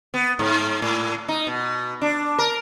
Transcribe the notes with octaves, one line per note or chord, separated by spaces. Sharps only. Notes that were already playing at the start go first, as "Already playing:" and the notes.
B3
G#2
A2
D#4
B2
D4
A#4